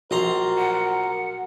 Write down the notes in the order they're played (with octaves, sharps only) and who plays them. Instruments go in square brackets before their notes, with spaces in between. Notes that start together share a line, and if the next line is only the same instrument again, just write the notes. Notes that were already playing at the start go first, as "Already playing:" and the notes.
[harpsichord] A#1 A#5 C6 [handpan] F#4 [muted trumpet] A#4
[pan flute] F#5